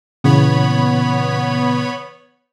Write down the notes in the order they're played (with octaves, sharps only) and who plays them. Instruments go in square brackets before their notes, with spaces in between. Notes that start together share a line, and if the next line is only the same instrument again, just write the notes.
[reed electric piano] A#2 C#3 E3 [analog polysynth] B3 C#5 B5